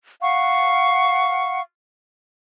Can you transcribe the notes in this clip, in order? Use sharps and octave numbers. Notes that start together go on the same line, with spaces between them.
F5 F#5 C#6